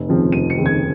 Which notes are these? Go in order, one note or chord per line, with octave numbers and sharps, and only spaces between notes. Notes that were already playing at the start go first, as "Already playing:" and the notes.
Already playing: F1
D#2 C#3 F3 C4
F1 D#7
C#7
D#2 C#3 F3 C4
G#6